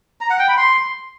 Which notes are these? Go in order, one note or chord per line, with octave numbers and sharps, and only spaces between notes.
A#5
F#5
G5
B5
C6